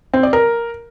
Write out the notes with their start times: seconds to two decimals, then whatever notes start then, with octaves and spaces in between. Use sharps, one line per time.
0.14 C4
0.23 D5
0.33 A#4